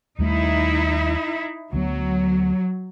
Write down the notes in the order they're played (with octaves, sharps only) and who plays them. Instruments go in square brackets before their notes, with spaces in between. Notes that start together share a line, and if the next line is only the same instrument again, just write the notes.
[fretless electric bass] D#2 G3 A3 [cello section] D#4 E4
[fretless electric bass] D2 G#3 B3 [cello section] F#3